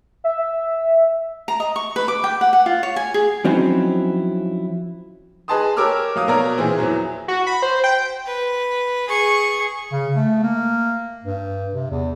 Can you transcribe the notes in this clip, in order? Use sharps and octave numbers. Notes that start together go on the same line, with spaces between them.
E5
A#5
D#5
C#6
B4
D6
G5
F#5
F#5
F4
C#5
G#5
G#4
F3 F#3 C4 C#4 D#4 E4
G#4 B4 D#5 A5 C6 D#6
G4 A#4 C#5 D6 E6 F6
F#3 F5 D#6
B2 A#4 C#5 D5 A#5
A#2 E3 C4 E4 G#4
E2 E3 F#3
F#4
B5
C5
G5
B4
G#4 C#6
C#3
A3
A#3
G2
C3
E2